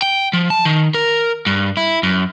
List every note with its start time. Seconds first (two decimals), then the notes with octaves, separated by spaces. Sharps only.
0.02 G5
0.33 F3
0.50 A5
0.65 D#3
0.94 A#4
1.46 G2
1.77 E4
2.03 F#2